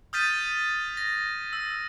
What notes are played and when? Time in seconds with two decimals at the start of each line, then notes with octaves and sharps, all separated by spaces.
0.13 D#6 F6 G6 A6 B6 D#7
0.97 A#6
1.53 E6